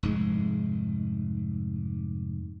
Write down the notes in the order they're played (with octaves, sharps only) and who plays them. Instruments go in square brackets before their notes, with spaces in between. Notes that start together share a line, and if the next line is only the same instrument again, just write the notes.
[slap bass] F1 G#2 G#3